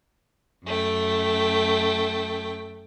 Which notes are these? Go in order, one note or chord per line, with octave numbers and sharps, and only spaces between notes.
F#2 A3 G5